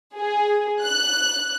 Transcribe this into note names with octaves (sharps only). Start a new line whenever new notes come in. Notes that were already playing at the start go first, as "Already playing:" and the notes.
G#4
F#6